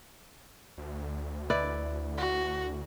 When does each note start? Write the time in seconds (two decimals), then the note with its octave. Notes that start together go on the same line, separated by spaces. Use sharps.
0.78 D2
1.50 E4 B4 D5
2.18 F#4